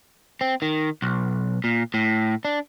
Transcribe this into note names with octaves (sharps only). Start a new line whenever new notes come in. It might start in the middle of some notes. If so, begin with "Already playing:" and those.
C4
D#3
B1
A#2
A2
D4